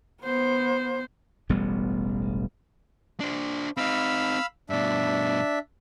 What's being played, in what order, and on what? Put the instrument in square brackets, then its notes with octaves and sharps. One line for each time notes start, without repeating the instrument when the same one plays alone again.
[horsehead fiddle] B3 C5
[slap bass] E1 A1 G3 B3
[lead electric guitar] D4 C5
[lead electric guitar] C4 D#4 [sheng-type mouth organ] F5 B5 E6
[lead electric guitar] G2 B2 [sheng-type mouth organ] D4 E5